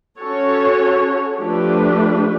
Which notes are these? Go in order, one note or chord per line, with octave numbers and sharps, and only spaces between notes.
C#4 F#4 A4 C#5
F3 A3 D4 G4 B4